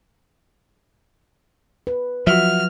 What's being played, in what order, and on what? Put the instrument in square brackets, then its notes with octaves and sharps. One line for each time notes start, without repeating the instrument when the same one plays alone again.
[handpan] B4
[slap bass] F3 [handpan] F#3 [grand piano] F#4 E5 [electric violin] F6